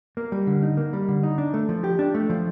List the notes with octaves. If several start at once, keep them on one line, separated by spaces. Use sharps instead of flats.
A#3
G3
D3
D#4
A#3
G3
D3
D#4
D4
A3
F3
G4
D4
A3
F3